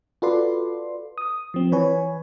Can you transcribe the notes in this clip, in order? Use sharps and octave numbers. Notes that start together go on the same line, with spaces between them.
F4 F#4 A4 B4 D5 C6
D#6
F3 C4
E3 B4 C#5 G#5